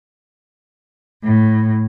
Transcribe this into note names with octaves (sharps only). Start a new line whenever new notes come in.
A2